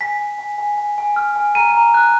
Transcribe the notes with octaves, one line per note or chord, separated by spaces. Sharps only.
G#5 B6
G#5
G#5
G#5
G#5
G#5
F6
G#5
A#5 D#7
A#5
F#6